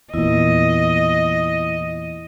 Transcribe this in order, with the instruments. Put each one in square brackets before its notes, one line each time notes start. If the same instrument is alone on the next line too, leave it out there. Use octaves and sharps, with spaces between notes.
[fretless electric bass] E2 A#2 [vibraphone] E4 [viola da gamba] D#5